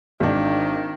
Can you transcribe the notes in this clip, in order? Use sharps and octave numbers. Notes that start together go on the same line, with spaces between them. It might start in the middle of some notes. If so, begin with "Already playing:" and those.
G#1 D#3 D4